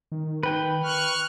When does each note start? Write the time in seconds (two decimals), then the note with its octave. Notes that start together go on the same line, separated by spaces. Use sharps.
0.12 D#3
0.43 B4 G5
0.83 C#6 F6 F#6